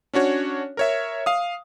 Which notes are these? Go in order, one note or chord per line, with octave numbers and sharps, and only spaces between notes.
C#4 D4 F#4 C#5
A#4 C#5 E5
F5 D#6